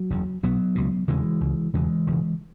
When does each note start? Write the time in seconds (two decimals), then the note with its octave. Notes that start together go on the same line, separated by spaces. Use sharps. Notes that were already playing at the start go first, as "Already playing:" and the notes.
Already playing: F#3
0.10 F#1 E2 C#3
0.43 B1 B2 F#3 B3
0.75 C#2 B2
1.08 E1 E2 C#3 E3 G#3
1.41 C#2 C#3
1.73 E1 E2 C#3 E3 G#3
2.07 E1 E2 C#3